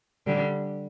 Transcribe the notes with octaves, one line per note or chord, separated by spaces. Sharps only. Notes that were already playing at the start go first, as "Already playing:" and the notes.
D3 G3